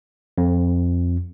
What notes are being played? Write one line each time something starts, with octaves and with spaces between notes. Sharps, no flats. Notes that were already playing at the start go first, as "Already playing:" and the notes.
F2